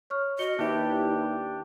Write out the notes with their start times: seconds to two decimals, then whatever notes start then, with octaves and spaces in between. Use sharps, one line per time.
0.10 C#5 C#6 F6
0.39 F#4 D#5 C#7 G7
0.59 D#2 D4 E4 G4 B4 D5 E5